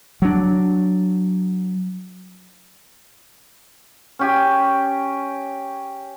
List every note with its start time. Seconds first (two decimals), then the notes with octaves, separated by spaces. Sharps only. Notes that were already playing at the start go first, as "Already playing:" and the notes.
0.22 F#3 D4
4.19 C#4 G4 G#5